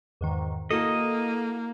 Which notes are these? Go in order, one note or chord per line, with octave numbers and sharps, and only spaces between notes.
E2 G#2 D#3
A#3 E4 F#4 A4 D#5